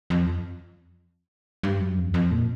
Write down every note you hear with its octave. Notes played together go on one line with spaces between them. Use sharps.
F2
G2
F#2
F2
F2
A#2